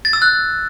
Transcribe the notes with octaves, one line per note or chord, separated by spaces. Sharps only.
A6
E6
F#6